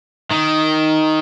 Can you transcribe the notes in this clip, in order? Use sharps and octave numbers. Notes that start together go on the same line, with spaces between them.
D#3